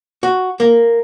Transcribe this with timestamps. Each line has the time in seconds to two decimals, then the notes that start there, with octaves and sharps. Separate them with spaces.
0.23 F#4
0.60 A#3